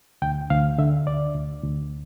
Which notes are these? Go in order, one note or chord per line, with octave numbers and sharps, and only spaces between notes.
D2 G5
D2 F5
D3 E5
D2 D5
D2
D2